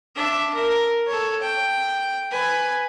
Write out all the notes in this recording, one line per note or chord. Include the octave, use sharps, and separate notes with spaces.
D4 E5
A#4
A4 C#5
G5
B4 G#5